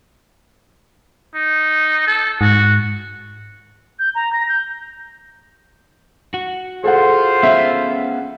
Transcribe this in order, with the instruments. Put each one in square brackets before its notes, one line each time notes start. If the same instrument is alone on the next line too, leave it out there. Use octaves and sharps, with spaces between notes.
[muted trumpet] D#4
A4
[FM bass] G#2 [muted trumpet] F#4
[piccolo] G6
A#5
A#6
G6
[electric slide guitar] F#4
[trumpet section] F4 C5 [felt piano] G#4 A4 F#5
[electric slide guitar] B3 C#4 F5 [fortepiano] E5